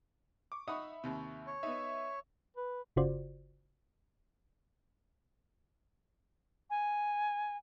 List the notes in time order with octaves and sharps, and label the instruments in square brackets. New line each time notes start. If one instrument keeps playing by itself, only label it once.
[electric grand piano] C#6 D6
[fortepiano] D#4 F#5 D#6 [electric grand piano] E5 B5 C#6
[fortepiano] D#2 C3
[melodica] C#5
[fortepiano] B3 D#4 [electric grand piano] E5
[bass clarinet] B4
[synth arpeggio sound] G1 C#3 F4 F#4 C5 D5
[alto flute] G#5